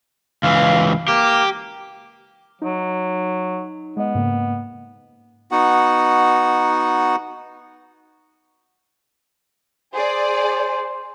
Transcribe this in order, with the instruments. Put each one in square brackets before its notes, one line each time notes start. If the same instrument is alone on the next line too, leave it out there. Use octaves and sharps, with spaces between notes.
[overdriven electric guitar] C#2 E3 [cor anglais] F5
[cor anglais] A#3 [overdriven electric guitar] G4
[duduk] F#3 [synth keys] D#4
[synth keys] G#3 D#5 [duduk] B3
[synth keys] G#2 C#3 A#3
[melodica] B3 D#4 F#4 F#5
[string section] G#4 D5 [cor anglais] C5